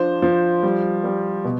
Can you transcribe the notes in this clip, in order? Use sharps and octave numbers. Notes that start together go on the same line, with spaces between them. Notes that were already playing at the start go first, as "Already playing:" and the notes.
Already playing: F3 D4 C5
F3
G3
G3
B2